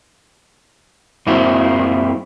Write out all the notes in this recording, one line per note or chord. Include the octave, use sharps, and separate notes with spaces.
F#2 A#3 C4 E4 F4